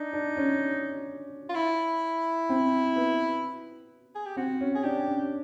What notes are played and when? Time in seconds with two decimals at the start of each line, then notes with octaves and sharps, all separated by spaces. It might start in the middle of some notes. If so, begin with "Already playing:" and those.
Already playing: D4 D#4
0.13 D4
0.37 C#4
1.49 F4
1.55 E4
2.49 C4
2.96 B3
4.15 G#4
4.26 G4
4.37 C4 F#4
4.61 C#4
4.75 G#4
4.84 D4 G4
5.08 C#4